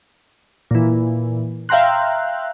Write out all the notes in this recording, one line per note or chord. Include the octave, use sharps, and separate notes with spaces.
A#2 E3
E5 F5 G5 A#5 C6 F#6